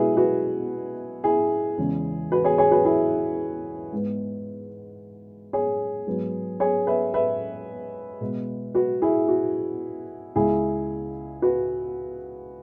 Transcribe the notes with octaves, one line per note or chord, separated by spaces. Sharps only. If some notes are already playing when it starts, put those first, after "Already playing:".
Already playing: B2 G#3 C#4 E4 F#4 G#4 B4
F#4 B4
E4 G#4
E2 C#3 E3 G#3 C#4
F#4 B4
G#4 C#5
G#4 C#5
F#4 B4
E4 G#4
G#2 G#3 B3
G#4 C#5
G#2 F#3 B3
G#4 C#5
B4 E5
B4 E5
B2 G#3 B3
F#4 B4
E4 G#4
F#4
C#2 C#3 G#3 C#4 E4 G#4
F#4 B4